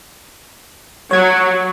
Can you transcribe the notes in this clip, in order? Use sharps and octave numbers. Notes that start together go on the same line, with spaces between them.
F#3 C#5 G#6